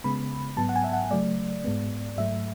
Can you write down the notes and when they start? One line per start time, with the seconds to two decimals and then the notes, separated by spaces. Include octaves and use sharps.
0.04 C#3 G#3 B3 B5
0.57 G#2 F#3 B3 A5
0.69 F#5
0.76 G#5
0.84 E5
0.93 F#5
1.11 C#3 F#3 A3 D5
1.64 G#2 G#3 B3
2.18 G#2 F#3 A3 E5